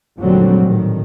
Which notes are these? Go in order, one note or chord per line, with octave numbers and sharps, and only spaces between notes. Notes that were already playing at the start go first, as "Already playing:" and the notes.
F1 A#2 D3 F#3 G3 C4
D2 A2 D#3